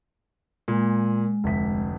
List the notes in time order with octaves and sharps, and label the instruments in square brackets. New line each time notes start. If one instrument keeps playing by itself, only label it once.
[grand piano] A#2 [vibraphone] G#3
[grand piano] F1 D2 B6